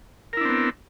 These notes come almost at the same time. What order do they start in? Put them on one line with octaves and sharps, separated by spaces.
A#4 E4 D4 C4 B3